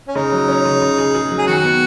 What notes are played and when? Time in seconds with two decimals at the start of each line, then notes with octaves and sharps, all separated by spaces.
0.08 C#4
0.15 C#3 D#4
0.32 F#3
0.48 C#4
0.65 C#3
0.82 C#3
0.98 G#4
1.15 G#4
1.31 F#3
1.38 G#4
1.47 D#3 F#4
1.64 B3